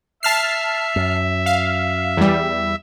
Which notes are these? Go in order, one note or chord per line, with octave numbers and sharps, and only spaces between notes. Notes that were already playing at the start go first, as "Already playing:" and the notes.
E5 A5 F6 C7
F#2
F5
E2 G3